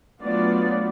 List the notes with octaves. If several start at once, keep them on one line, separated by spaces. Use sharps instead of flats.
F#3 A3 B3 D4 F4 D5